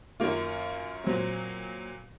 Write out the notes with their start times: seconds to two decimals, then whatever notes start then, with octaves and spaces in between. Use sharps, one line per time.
0.20 F#2 D#3 A#3 F4
1.04 A#2 F#3 C4